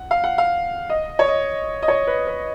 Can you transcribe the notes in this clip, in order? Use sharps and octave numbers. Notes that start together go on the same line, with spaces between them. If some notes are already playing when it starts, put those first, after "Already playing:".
Already playing: F#5
F5
F#5
F5
D#5
C#5
D#5
D#5
C#5
B4
B4